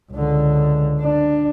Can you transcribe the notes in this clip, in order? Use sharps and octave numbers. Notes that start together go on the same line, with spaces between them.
C#2 D3
D4